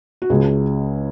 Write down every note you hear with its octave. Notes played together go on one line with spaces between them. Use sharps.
F#4
C#2 C#3 G#3 G#4